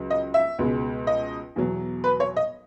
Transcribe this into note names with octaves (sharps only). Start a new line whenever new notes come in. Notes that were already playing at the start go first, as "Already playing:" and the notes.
Already playing: C#2 C#3 F#3
D#5
E5
C#2 B2 G#3
D#5
E2 B2 F#3
B4
C#5
D#5